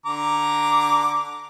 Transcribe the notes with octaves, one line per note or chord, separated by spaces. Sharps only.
D3 A#5 D6